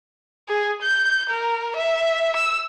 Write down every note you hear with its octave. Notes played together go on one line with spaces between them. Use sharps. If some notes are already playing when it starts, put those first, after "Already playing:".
G#4
G6
A#4
E5
E6